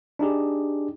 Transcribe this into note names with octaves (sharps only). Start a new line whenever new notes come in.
D4 D#4 G4 G#4